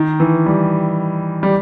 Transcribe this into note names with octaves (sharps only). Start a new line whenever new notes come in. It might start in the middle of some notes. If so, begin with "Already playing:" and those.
Already playing: D#3
E3
G3
G3